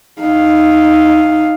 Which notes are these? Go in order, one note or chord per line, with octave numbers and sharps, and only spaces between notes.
D#4 F5